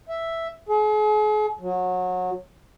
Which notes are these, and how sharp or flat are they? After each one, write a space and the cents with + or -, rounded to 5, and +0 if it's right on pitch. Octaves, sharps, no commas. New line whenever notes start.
E5 +0
G#4 +40
F#3 -25